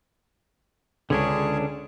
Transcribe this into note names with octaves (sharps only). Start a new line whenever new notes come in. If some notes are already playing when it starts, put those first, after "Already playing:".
C#2 D3 C#4 D4 G#4 C#5